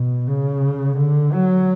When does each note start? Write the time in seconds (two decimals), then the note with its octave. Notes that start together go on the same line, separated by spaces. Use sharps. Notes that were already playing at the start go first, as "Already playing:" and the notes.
Already playing: B2
0.27 C#3
0.98 D3
1.32 F#3